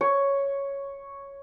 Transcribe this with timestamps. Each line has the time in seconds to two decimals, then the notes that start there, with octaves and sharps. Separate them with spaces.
0.01 C#5